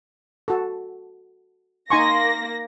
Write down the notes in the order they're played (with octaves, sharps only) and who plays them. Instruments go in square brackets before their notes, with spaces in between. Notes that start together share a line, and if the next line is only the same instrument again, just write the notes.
[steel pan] F#4 A4
[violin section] A#3 A#6 [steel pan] D#4 G#5 C#6 [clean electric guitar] C6